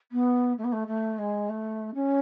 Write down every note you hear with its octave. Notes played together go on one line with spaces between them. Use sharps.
B3
A3
B3
A3
A3
G#3
A3
C#4